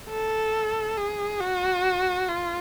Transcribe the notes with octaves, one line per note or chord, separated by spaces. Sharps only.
A4
G#4
F#4
F4